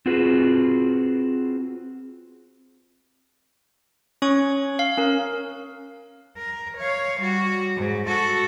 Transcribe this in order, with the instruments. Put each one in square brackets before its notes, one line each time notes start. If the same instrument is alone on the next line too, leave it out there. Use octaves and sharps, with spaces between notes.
[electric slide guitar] C4 F4 F#4 G#4 B4
[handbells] C#4 C#5 C#6
F5
C#4 A#4
[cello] A#4
C#5 F5
G3 F#4
G#2
F#4 A4